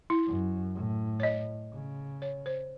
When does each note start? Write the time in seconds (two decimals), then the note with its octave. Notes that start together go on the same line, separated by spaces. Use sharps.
0.10 E4
0.26 F#2
0.75 A2
1.20 C#5
1.23 D#5
1.73 C#3
2.22 C#5
2.46 C5